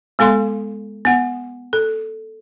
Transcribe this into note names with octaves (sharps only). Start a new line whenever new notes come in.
G#3 B3 A4 F5 C6
B3 F#5
A4